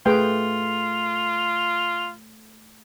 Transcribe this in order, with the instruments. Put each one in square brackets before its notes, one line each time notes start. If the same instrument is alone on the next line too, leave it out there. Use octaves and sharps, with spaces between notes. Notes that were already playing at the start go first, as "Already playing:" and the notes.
[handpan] A3 [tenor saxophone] F4 [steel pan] G#4 B4 G5